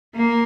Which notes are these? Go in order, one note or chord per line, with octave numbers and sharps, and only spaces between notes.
A#3